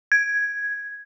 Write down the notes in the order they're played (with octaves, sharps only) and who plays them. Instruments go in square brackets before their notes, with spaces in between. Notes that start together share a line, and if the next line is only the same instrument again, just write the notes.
[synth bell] G#6